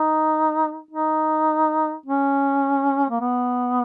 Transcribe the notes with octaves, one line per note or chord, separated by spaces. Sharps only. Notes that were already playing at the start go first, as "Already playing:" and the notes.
Already playing: D#4
D#4
C#4
A#3
B3